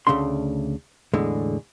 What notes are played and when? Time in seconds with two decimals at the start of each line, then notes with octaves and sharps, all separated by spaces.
0.07 D2 A#2 C#3 A3 D4 C6
1.14 E2 A2 D3 G#3